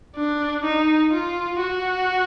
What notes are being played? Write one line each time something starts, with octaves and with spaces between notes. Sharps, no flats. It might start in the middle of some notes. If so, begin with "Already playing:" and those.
D4
D#4
F4
F#4